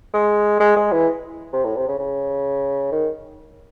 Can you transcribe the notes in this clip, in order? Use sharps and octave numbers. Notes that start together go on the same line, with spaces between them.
G#3
G#3
G#3
E3
C3
A2
C3
C#3
C#3
D#3